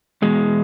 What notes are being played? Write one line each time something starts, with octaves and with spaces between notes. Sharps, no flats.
E2 B2 G#3